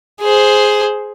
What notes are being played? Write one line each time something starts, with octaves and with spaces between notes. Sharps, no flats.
G#4 C5